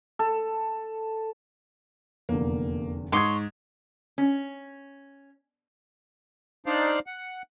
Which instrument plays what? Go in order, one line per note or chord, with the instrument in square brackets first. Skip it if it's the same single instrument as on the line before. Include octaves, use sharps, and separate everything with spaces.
[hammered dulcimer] A4
[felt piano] F1 E2 D3 [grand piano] A#3
[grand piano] G#2 [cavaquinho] C#5 C6 [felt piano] D6 D#6 G#6
[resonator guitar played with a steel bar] C#4
[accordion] D4 D#4 C5 D5 F5
F#5